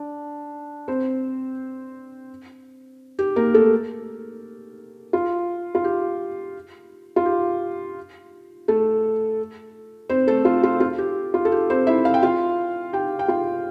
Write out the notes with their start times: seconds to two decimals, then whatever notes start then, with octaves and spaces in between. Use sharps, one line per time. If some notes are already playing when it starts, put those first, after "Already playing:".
Already playing: D4
0.88 C4 C5
3.19 G4
3.36 A#3 A#4
3.54 A3 A4
5.13 F4
5.75 F4
5.84 G4
7.16 F4
7.26 G4
8.68 A3 A4
10.09 C4 C5
10.27 A3 A4
10.45 F4
10.63 F4
10.80 F4
10.98 G4
11.34 F4
11.45 A4
11.52 G4
11.70 C4 C5
11.87 E4 E5
12.05 F5
12.14 G5
12.23 F4 F5
12.93 G4 G5
13.19 G5
13.28 F4 F5